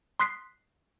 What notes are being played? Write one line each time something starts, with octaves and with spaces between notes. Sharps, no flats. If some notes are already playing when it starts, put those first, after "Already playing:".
C6 D#6 F#6 B6 C7